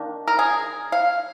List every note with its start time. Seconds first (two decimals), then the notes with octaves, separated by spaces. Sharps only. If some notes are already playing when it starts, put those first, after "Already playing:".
Already playing: D#3 A#3 D4
0.28 A#4
0.39 G#4
0.92 F5